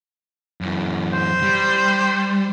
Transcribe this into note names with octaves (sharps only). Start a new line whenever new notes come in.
F#2 E3
C5
G3